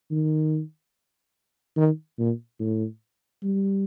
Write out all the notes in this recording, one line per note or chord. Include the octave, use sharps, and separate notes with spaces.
D#3
D#3
A#2
A2
G3